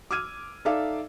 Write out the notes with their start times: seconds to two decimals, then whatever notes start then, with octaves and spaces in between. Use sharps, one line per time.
0.11 D6 E6 F6 G#6 D#7
0.65 D#4 A4 D5 E5 F5 D6